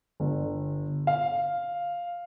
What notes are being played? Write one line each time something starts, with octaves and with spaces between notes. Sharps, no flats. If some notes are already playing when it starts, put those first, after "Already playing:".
G1
F5